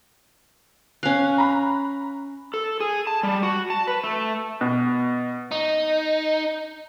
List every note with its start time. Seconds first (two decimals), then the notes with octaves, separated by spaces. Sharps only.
1.03 C#4 F5 F#6
1.38 A#5 B5
2.54 A4
2.80 G#4
3.07 A5
3.23 G3
3.43 F#4
3.70 A5
3.87 B4
4.04 A3
4.61 B2
5.51 D#4